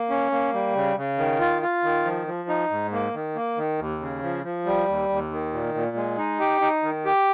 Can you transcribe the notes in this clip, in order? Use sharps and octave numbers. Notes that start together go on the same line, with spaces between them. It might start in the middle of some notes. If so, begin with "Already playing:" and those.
Already playing: A#3
C#4
A#3
G3
C#3
C#3
D#3
F4
F4
D#3
F3
F3
D#4
G#2
A#3
D#3
A#3
D#3
D#2
C#3
F3
F3
G3
D#2
D#2
D#3
A#2
A#2
G#3
D#4
G4
D#4
D#3
G4